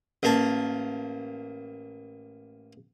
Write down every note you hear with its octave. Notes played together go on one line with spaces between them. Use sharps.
A1 A#3 A5